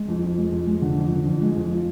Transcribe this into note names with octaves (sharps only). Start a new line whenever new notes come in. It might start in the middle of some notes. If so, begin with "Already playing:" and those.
Already playing: G#3
F2
F2
G#3
F2
G#3
D3
F2
D3
F2
G#3
F2
F3